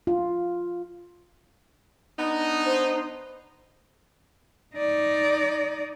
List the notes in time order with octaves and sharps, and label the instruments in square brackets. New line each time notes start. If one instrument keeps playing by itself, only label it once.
[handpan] F4
[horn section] B3 D4 D#4
[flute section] C5
[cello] D#4 D5